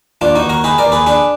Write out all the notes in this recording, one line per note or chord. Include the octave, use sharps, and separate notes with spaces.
D#2 D4 F4
D#4 F#4
D#2
F#4 A#4
D#3 G#4 B4
A#4 D5
D#2
G#4 B4
D4 G#4 B4